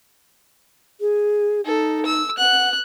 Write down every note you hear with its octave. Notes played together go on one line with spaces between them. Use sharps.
G#4
D#4 A4
E6
F#5 F#6